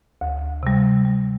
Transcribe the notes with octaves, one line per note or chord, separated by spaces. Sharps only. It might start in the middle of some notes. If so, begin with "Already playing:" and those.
D2
C3 G3
G3